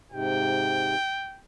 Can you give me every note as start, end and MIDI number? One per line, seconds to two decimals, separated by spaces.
0.12 0.95 44
0.12 0.95 48
0.12 1.41 79